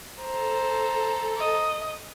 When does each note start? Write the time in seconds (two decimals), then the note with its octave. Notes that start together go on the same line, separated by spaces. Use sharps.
0.21 A4 C5 A#5
1.37 D#5